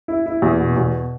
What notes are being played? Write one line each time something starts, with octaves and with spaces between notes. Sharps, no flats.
E4
E4
E2
B2
E2